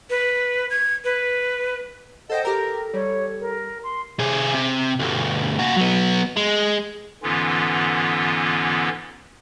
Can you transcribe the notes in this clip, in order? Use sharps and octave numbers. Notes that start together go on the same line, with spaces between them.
B4
G#6
B4
A4 C5 D#5 F#5 G5
G4 A4 A#4 A#5
G3 C#5
A#4
C6
C3 G#4
C3
D2 G2
A#3 F#4
F#3 B3
G#3
G#2 D3 E3 B3 C#4 F4